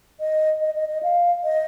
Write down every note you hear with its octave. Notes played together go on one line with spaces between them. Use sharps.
D#5
D#5
D#5
D#5
F5
D#5